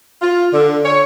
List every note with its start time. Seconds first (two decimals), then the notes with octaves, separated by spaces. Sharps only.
0.22 F4
0.52 D3
0.85 C#5